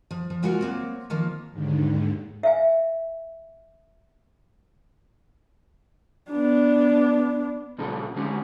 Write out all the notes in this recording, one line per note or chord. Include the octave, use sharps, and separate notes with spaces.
F3
F3
C#3 G#3 A#3 F4 F#4 F#5
F#3 A#3 C4
D#3 F3 A#3
D#2 G#2 D3
E5 F5 G#5
B3 D4
A#2 C#3 G3 A4
D3 G#3 C4 C#4 G4